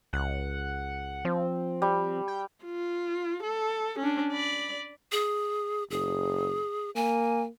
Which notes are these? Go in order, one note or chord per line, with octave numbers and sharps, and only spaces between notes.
C#2 F#5
F3 C4
G3
G5
F4
A4
C#4 D4
D5 B5
G#4
F#1 G#4
A#3 G#5